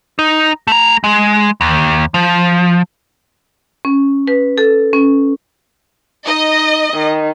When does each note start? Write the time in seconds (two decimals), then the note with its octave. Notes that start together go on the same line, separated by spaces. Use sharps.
0.19 D#4
0.67 A3 A#5
1.04 G#3
1.61 D#2
2.14 F3
3.85 C#4
4.27 B4
4.58 A4
4.93 C#4
6.27 D#4 D#5
6.93 D#3